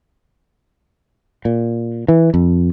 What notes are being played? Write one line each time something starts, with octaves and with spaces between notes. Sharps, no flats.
A#2
E3
F2